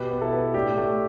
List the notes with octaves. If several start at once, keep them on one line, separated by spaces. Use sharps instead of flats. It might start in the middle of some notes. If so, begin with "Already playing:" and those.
Already playing: B2 G4 B4
B3
E4 A4
B3
A2 D4 G4
A3